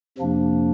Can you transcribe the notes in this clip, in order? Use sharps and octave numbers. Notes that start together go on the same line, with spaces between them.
F2 C3 F3 A#3 D4